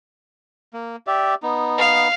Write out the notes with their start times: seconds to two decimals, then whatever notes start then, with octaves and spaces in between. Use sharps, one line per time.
0.74 A#3
1.07 G4 D5 E5
1.43 B3 D#4
1.78 F5